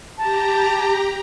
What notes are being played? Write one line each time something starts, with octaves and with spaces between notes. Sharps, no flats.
G4 A5 A#5